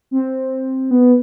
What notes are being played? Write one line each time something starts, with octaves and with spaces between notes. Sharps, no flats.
C4
B3